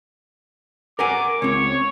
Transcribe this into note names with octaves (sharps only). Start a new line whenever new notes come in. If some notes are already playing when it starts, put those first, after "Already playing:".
A#4 F#5 G#5 D6
C#2 C4 C#5